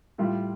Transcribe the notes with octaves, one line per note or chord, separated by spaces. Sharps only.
A2 G3 F4